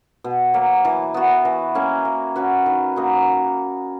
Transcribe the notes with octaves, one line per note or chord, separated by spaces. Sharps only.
B2
F#3 A#3
E3
B3 F#4
E3
A#3 C#4
A#3
C#4 F#4 B4
D#3
A#3 D#4 F#4